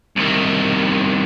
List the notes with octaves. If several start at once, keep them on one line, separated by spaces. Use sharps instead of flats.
C2 D#3